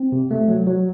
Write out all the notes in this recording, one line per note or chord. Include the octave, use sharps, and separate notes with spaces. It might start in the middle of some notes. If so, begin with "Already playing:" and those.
Already playing: C4
C3
A3
F#3
F#3